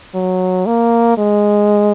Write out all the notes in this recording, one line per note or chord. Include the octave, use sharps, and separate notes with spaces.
F#3
A#3
G#3